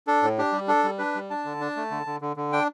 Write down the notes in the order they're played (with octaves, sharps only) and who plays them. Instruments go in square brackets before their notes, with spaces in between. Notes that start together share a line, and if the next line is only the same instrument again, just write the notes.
[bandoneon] D4 A4
A2
D4 G4
G3
D4 A4
G3
D4 B4
G3
D4 A5
D3
D4
A3
D3
D3
D3
D3
D4 G5